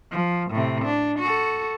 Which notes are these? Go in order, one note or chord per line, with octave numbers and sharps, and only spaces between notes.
F3
A2 C3
D4
F#4 A4